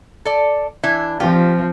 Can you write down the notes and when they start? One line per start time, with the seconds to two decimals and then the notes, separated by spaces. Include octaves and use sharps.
0.25 A4 D5
0.84 E3 D4 E4
1.20 F3 C4 F4 G4